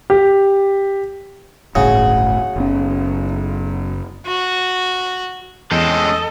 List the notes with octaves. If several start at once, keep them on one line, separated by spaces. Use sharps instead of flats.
G4
D1 G1 A2 C#3 F#4
F#1 B1 C#4
F#4
E2 G#3 C4 C#4 A4 D#5 G6